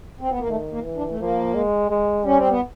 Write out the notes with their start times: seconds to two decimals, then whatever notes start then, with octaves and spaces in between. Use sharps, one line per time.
0.21 C4
0.30 B3
0.39 A#3
0.49 D#3 A3
0.72 A#3
0.84 E3
0.96 D4
1.10 A3
1.19 F3 A#3
1.55 G#3
1.90 G#3
2.25 G3 C#4
2.37 C4
2.49 B3